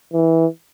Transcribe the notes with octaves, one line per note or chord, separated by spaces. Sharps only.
E3